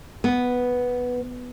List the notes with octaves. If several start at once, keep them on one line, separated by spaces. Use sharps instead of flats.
B3